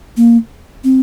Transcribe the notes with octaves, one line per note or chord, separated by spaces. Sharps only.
A#3
C4